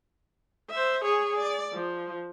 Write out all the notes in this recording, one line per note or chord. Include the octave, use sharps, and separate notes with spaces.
C5 E5
G#4 C#5
D5
F3